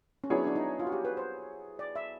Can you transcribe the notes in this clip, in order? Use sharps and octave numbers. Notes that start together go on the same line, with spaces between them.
C#4
F#3 B3 D4 E4 G#4 C#5
D4
D#4
F4
F#4
G4
B4
C5
D5
E5